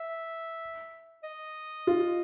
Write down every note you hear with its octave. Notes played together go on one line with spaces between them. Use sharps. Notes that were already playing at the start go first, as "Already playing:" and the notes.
Already playing: E5
D#5
F4